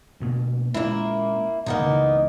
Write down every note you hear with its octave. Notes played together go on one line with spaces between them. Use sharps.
D2 B2 A#3
A#2 G#3 A#3 C#4 E4
D#1 A#2 D#3 A#3 B3 D#4
C#2 C#3 E3